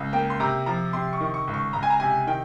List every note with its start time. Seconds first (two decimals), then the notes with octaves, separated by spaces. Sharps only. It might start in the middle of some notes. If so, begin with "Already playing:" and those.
Already playing: C#2
0.13 A#3 G5
0.30 C6
0.40 C3 A#5
0.66 F3 A#5
0.93 C3 C6
1.13 C#6
1.20 D#3
1.34 C#6
1.47 C#2
1.54 C#6
1.73 C#2 A#5
1.83 G#5
1.90 A#5
2.00 C3 G#5
2.27 D#3 G5